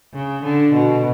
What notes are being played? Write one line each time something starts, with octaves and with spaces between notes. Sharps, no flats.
C#3
D3
B2